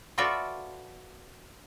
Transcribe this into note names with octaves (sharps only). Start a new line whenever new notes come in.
F4 F#4 A4 B4 D5 E5